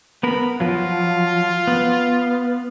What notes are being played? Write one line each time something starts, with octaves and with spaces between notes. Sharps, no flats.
B3 A#4 B5
F3 F#3 F4
B3